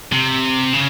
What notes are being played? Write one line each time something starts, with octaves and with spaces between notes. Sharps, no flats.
C3
C#3